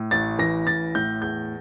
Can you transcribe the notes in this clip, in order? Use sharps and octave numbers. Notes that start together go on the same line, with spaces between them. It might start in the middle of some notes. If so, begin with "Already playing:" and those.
Already playing: A2
A1 A6
E3 A#6
A1 A6
A2 G6
E2 G6